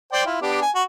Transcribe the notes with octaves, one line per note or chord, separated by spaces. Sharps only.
C5 D5 G5
E4 F4
B3 D4 G4
G#5
F#4